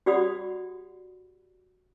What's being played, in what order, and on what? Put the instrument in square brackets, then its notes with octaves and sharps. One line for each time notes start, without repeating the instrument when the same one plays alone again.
[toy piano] F#4 G4 D5 F#5 B5 D#6